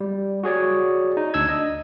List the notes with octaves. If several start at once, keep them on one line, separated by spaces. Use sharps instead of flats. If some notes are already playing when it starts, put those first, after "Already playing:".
G3
F#4 G#4 C#5 D5
D#4
D2 D4 E6 G#6
D#5